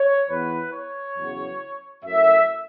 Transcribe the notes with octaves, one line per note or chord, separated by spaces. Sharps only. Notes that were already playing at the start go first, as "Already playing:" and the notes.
Already playing: C#5
E2 E3 B3 B4
C#5
E2 C#3 F#3
F#2 F#3 A3 E4 E5